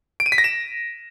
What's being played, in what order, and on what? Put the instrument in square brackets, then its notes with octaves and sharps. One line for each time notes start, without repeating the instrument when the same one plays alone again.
[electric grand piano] D7
D#7
B6
A#6
E7